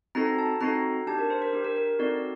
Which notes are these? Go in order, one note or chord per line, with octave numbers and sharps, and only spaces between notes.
C4 D#4 F#4 A4 A#5
A5
C4 D#4 F#4 A4 A#5
D4 G4 A5
A#4
C5
A#4
D4 G4
A#4
A#4
C4 D#4 F#4 A4 D5